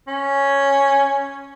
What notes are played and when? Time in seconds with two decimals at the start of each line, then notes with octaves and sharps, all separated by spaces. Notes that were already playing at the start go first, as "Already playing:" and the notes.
0.08 C#4